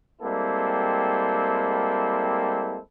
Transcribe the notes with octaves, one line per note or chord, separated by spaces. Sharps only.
G3 G#3 A#3 C4 E4 A4